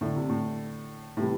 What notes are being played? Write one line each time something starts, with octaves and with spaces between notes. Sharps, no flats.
A2 D3 A3 E4 A4 D5
C3
A2
A2 C3 E3 G3 E4